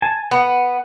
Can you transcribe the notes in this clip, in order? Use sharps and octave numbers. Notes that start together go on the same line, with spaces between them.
G#5 A5
B3 F#5